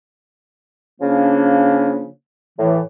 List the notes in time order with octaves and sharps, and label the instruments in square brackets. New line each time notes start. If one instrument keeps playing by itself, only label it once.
[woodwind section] C#3 F3 A#3 C#4 D4
A2 E3